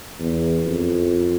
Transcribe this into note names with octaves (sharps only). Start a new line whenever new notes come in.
E2
F2